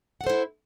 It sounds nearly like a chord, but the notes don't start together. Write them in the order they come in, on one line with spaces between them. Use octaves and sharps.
F#5 A4 C5 E4